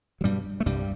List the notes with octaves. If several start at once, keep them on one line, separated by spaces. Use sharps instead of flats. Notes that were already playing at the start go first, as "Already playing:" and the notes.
F#3
G2 B2 G3
A3
C2 G2 G3